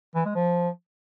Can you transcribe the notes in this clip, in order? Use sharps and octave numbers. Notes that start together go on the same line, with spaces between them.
E3
G#3
F3